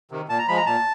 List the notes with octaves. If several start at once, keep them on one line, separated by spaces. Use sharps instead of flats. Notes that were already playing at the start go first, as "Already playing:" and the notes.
C3 D#3
A#2 A5
A#5
F3 G#3 B5
A#5
A#2 A5